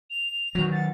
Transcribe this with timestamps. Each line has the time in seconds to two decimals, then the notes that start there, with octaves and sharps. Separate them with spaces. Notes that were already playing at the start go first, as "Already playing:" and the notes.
0.10 F7
0.55 D#3 F#3 F#4
0.72 F#5 A6